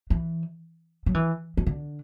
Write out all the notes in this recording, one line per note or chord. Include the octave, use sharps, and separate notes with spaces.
E3
F#3
E3
E3
D3